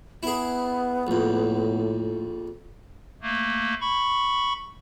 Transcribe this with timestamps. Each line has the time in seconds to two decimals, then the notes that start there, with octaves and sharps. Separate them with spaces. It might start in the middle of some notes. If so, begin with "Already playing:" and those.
0.23 B3 E4 G#4
1.07 A#1 F2 A2
3.22 A3 A#3
3.81 B5 C#6